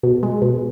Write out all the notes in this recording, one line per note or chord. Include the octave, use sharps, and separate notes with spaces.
B2
G#3
B2